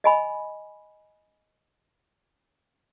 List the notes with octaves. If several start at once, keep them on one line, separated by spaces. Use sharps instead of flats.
D#5 G#5 B5